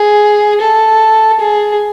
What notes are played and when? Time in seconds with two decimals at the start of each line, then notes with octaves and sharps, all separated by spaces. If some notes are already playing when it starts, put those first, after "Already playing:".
Already playing: G#4
0.61 A4
1.40 G#4